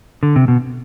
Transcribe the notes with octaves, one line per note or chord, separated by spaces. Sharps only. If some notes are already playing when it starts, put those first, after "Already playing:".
D3
C3
B2